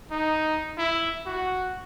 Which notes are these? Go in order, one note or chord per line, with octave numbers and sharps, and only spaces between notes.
D#4
E4
F#4